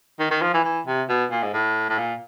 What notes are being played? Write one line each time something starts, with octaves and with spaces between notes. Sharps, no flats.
D#3
D#3
F3
E3
E3
C3
B2
A#2
G#2
A2
A2
A#2